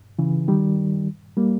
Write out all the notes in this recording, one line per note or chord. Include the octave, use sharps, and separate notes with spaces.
C#3 E3
D#3 G3
G3 A#3